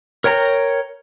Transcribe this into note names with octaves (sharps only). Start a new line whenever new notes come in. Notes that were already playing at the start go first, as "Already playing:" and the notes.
A#4 C#5 G5 A#5